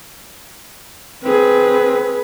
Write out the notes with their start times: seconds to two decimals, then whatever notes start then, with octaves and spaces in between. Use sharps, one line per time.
1.24 C4 G#4 B4